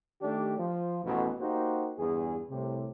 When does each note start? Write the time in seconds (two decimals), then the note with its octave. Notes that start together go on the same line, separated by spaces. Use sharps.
0.22 D#3 A3 D4 G4
0.58 F3
1.05 A1 F2 B2
1.40 A#3 D#4 F#4 G4 C5
1.98 E2 G2 G#4
2.50 C2 A2 C3